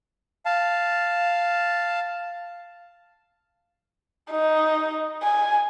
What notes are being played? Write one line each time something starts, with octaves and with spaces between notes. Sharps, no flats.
F5 A5
D#4
G#5